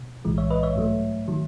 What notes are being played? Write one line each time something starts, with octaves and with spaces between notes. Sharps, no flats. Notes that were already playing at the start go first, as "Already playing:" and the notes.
Already playing: B2
B1 A2 E3 G#3
C#5 E5
B4 D#5
C#5 E5
G#2 F#3 A3
D#3 F#3